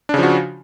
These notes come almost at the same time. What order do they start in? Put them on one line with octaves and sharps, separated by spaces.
D4 C#3 F3 F#4